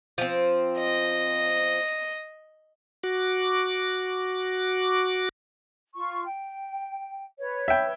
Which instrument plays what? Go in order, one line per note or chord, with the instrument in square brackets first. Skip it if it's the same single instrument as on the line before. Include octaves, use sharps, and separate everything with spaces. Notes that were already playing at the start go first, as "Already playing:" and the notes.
[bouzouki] F3 C4
[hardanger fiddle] D#5
[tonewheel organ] F#4 D6
[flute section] F4 C#6
G5
B4 C#5
[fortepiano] E5 G5